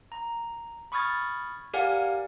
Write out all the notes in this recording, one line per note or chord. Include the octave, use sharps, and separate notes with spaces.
A#5
B5 C#6 D#6 F6 G#6 A6
G4 A#4 D5 F5 F#5 G#5